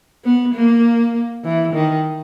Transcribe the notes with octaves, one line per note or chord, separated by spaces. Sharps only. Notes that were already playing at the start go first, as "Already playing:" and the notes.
B3
A#3
E3
D#3